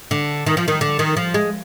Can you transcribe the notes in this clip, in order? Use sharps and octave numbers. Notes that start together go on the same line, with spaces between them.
D3
D#3
F3
D#3
D3
D#3
F3
G#3